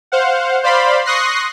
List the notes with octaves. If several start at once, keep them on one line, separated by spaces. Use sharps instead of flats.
C5 F5 F#5
C5 D5 F5 B5 C6
C6 C#6 D#6 F#6 A#6 C7